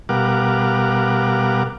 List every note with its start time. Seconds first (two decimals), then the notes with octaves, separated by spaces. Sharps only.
0.09 B2 G3 A#4 F5 F#5 D6